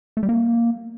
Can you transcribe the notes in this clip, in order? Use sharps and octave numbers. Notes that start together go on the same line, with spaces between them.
A3
G3
A#3